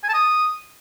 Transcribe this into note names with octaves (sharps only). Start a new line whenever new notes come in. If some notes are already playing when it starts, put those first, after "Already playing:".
G#5
A5
D#6